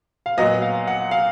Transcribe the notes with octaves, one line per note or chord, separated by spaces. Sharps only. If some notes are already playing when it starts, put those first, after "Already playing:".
F5
A#2 F#3 B3 D#5
F5
F#5
F5